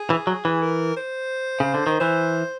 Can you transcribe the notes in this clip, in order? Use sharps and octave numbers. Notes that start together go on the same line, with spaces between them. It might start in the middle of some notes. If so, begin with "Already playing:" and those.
Already playing: G#4
E3
F#3
E3
A#4
C5
C#3
D3
D#3
E3 C5